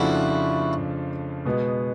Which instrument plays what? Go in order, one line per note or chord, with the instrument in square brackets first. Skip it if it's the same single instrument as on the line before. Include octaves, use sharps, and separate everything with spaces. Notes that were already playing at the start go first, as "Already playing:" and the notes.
Already playing: [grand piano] F2 C#3 F3 A3 D4 [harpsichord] E4 F#4
[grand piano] B2 G#3 B3